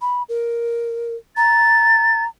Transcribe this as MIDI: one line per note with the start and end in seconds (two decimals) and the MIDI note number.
0.01 0.22 83
0.29 1.16 70
1.37 2.27 82
1.37 2.22 93